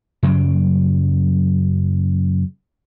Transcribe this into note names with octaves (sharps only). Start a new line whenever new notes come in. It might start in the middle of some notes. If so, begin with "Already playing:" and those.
F#2 C#3 F#3 G3